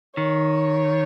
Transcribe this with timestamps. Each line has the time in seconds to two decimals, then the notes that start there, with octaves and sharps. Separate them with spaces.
0.17 D#3 C#5